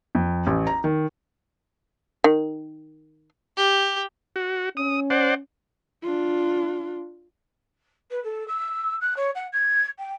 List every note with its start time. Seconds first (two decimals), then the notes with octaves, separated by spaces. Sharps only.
0.15 F2
0.47 A1
0.67 A#5
0.84 D#3
2.24 D#3
3.57 G4
4.36 F#4
4.77 C#4 D#6
5.10 C5 D5 F#5
6.03 D4 F4
8.11 B4
8.24 A4
8.48 E6
9.01 F#6
9.16 C#5
9.35 F#5
9.52 G#6
9.98 G5